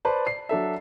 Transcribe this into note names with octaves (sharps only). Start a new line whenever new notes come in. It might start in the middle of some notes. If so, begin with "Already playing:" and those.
B4 C5 D5 A5
C7
F#3 D4 A4 E5